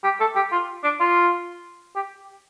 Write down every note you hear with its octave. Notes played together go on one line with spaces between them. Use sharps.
G4
A4
G4
F4
D4
F4
G4